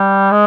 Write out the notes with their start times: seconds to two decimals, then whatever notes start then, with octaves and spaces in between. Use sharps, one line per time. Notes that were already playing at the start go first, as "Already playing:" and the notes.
Already playing: G3
0.31 G#3